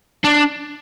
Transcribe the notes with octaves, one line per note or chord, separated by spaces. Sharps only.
D4